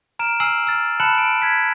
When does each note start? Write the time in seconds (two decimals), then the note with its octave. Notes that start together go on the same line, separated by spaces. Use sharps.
0.19 A#5 F6 D7 E7
0.40 G#5 E6 F6 C7 D#7 F#7
0.67 E6 F6 A6
1.00 A5 B5 F#6 C#7 E7 F#7
1.15 D7 F#7
1.42 G#6 B6